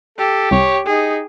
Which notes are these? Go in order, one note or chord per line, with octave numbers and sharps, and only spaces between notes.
G4 A4
C2 C#5
D#4 G#4